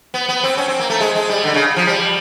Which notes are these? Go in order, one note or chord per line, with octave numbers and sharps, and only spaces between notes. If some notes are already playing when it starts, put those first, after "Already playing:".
B3
B3
C4
C#4
C4
A#3
A3
G#3
G#3
G3
D3
C#3
F3
G3